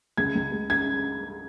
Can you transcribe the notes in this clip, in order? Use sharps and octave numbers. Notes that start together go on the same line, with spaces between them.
C#2 G#6
C#2
G#3
C#3 G#6